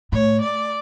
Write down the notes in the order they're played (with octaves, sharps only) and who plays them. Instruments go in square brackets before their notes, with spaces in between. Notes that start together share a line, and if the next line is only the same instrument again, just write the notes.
[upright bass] A2 [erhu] C#5
[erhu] D5